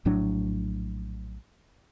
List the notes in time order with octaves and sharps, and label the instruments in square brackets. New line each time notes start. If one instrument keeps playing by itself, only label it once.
[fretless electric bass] A#1 A2 F#3 D4